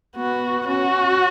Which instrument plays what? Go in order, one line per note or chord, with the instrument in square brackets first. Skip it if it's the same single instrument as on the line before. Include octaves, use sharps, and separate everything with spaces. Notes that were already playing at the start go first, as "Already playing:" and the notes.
[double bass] B3 [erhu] F#4
[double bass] C#4 [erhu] F#4